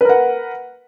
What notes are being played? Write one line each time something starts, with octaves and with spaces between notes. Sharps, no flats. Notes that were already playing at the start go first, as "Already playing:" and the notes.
A#4 B4 F#5